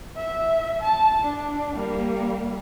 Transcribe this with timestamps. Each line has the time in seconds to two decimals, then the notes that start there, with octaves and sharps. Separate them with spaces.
0.16 E5
0.82 A5
1.24 D4
1.75 G3 A#3